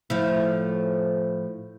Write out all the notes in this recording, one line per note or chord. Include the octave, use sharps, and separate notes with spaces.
A2 F3 E4